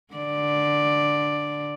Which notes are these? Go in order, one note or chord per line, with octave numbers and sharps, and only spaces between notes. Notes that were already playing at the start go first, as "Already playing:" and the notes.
D3 D5